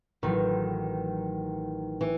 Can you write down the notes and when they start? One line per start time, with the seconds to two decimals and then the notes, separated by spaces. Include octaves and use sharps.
0.23 A1 A2 D#3 F#3
2.01 E3